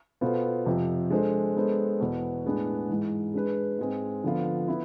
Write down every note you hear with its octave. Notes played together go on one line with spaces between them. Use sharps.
B2 B3 F4 A4 C5
F2 C3 F3
G#3 D4 A4 C5
G#3 B3 D4 A4 C5
E2 B2 B3
A2 G#3 B3 D4 G#4
G#2 E3 G#3
G#3 D4 G#4 B4
G#2 G#3 C4
D3 F3 B3 F4
B3 E4